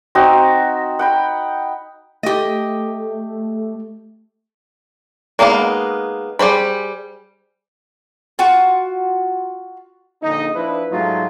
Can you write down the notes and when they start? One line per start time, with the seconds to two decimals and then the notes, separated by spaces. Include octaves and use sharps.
0.15 C4 D#4 F#4
0.99 F#5 G5 B5
2.23 A3 G4 D#5
5.39 G#3 A#3 B3 D#4 F5
6.39 G3 G#4 C5 B5
8.39 F4 F#4 F#5
10.22 A#1 D3 D#4
10.55 F3 D4 E4 B4
10.91 G#2 F#3 A3 D#4 F4